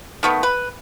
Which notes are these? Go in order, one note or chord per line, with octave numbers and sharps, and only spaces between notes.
D#3 A3 B3
B4